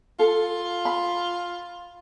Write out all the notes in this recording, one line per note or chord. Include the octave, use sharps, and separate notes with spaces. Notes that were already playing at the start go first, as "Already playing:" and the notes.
F4 A4
B5